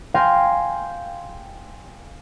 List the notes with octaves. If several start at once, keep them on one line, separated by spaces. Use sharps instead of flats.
F5 G5 G#5 C6 G6 A#6